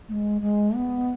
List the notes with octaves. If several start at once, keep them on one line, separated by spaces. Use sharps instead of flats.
A3
G#3
G#3
B3